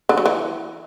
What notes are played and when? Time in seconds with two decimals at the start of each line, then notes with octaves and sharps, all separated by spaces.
0.09 D3
0.17 F#3
0.26 E3